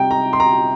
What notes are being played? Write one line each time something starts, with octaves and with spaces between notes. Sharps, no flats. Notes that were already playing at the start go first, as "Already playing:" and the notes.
Already playing: C3 G3 G5 A#5
A#5
C6
A#5